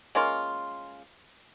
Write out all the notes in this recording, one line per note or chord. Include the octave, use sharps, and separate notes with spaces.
G#3 A#3 C#4 F4